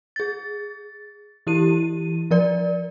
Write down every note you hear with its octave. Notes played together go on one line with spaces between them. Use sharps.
G#4 A6
E3 E4 G4 D#7
F3 A#4 D5